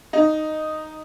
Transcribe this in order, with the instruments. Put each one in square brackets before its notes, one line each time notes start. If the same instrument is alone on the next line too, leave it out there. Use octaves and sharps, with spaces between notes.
[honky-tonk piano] D#4